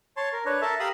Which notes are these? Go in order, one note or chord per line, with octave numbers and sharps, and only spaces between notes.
C#5 A5 C6
A#4
D4 B4 C#5
A4 A#4 E5 A5
G4 A#4 F5 B5 D#6 E6